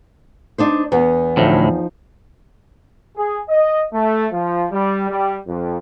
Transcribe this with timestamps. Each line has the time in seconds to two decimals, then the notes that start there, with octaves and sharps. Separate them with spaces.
0.58 D4 D#4 C5
0.92 E2 B3
1.37 D2 A2 F3 D#4
3.17 G#4
3.49 D#5
3.93 A3
4.32 F3
4.72 G3
5.10 G3
5.47 F2